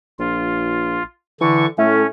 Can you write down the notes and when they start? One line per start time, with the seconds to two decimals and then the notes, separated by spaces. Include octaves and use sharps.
0.19 A#1 F4
1.41 D3 E3 C#6
1.78 A2 A3 C#4